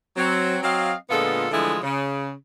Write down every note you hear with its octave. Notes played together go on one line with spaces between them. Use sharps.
F#3 C4
F#3 C4 D#5 F5
A#2 D3 G#3 B3 F4 A4
D3 E3 F3 G#3 A3 E4
C#3